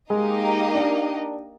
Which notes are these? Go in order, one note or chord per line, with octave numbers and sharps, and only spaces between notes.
G#3 A#3 D#4 G4 A#4 D#5
D4